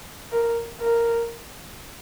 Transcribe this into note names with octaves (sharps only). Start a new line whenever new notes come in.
A#4
A#4